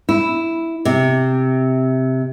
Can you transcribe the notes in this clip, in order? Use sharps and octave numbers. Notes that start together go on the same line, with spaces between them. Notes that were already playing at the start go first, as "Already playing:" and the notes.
E4
C3